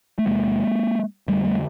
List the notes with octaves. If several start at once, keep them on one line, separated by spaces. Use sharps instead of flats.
A3
E2 C3 G#3 A#3
F2 D3 G3 A3
G3 A3